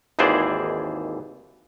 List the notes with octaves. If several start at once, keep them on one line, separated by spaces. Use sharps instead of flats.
G#1 D#2 E3 G#4 C5 D5